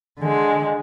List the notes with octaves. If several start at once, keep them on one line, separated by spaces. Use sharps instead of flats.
D3 G#3